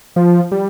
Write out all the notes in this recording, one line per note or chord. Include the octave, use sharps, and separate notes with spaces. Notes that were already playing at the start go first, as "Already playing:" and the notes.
F3
G3